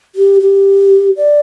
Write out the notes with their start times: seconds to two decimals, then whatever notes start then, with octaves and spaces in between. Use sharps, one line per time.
0.15 G4
0.41 G4
1.16 D5